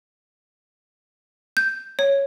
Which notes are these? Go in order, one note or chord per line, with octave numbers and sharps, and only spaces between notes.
G6
C#5